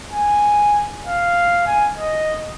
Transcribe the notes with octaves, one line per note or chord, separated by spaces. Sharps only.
G#5
F5
G#5
D#5